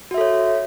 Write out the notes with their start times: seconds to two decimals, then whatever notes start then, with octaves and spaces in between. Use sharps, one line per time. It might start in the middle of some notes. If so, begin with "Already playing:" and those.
0.11 F#4
0.14 E5
0.18 A4
0.21 C#5